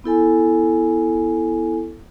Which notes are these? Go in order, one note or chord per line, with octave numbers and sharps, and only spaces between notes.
B3 E4 A4 G#5